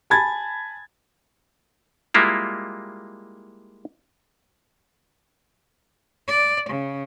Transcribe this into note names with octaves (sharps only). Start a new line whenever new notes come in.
G#5 A5 B5 G#6 A6
G3 G#3 A#3 E4 F4
D5
C#3